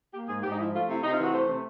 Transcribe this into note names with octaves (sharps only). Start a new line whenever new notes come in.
A#3 G4
G#2 G#4
G#2 G4
D#4
F3 E4
A3 F4
C3 E4
C3 D#4
F4
E3 F#4
A3 C5
C3